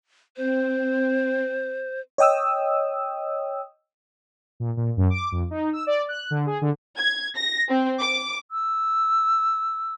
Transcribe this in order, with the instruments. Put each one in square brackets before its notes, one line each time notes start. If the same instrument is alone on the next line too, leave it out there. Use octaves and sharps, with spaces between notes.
[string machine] C4 [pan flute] C5
[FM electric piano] C#5 D#5 G5 D#6 E6
[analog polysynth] A#2
A#2
F#2
D6
F2
D#4
E6
D5
F#6
D3
G#4
D3
[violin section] G#6
A#6
C4
D6
[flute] E6